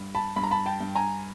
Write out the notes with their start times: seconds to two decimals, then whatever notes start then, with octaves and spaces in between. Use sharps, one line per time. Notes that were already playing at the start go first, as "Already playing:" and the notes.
Already playing: G2
0.15 A5 B5
0.36 G2 B5
0.43 A#5
0.51 A5 B5
0.66 G5 A5
0.81 G2
0.95 G#5 A#5